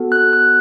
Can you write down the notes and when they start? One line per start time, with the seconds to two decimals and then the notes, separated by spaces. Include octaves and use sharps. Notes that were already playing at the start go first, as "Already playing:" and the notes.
Already playing: B3 F#4 A4
0.12 F#6
0.33 F#6